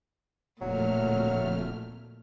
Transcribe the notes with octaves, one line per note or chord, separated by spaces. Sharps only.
D1 F2 A#2 F#3 A3 F6